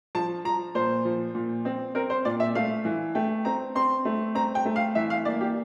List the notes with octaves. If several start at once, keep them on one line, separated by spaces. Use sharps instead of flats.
F3 A5
F3 A#5
A#2 C5
F3
A#2
C4
C4 A#4
C5
A#2 D5
E5
A3 F5
E3
A3 G5
C4 A#5
C4 C6
A3
C4 A#5
G5
A3
F5
E3 E5
F5
A#3 D5
G4